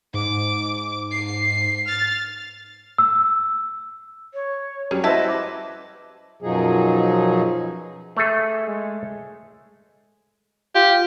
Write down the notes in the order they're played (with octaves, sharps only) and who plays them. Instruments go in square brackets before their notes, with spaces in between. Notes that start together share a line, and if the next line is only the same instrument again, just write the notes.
[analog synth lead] G#2 [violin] D6
[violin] C7
F6 A6
[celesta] E6
[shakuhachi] C#5
[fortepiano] F#3 G3 G#4 [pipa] C#4
[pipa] E4 E5 A5 [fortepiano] F#4 B4 C5 [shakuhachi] D#5
[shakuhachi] D6
[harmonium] F#2 B2 F3 F#3 D#4 G#4
[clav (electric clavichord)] A3 G#4 A4 [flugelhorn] E5
[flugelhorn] G#3
[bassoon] F4 [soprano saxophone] G4